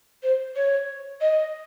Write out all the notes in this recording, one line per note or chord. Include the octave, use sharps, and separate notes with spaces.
C5
C#5
D#5